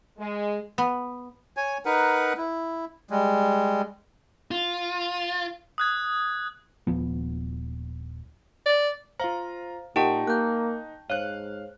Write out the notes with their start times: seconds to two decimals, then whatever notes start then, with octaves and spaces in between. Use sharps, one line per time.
0.18 G#3
0.78 B3
1.57 C#5 G#5
1.85 D#4 A#4 B4 F#5
2.37 E4
3.10 G3 G#3
4.51 F4
5.78 D#6 F#6 G#6
6.87 D#1 F3 B3
8.66 D5
9.20 F4 C5 F5 A#5
9.96 A#2 D#4 G4 A#4 F#5 G5 A5 C#6
10.27 A#3 F#6 G6
11.10 G#2 C5 C#5 F5 F#6